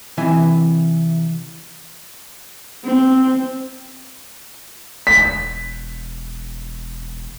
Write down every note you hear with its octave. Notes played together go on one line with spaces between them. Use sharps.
C3 E3 E4 G#5
C4
E1 B6